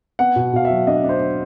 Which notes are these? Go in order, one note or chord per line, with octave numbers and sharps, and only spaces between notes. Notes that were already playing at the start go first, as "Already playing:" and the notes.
B3 F#5
B2
B2 F5
E5
F#3
D4 D#5
D4 C5
D4